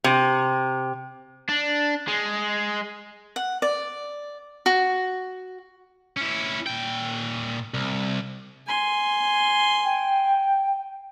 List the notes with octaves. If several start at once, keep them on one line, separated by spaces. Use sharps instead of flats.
C3
D4
G#3
F#5
D5
F#4
C#4 E4
A#2 G5
C2
G#5 C6
G5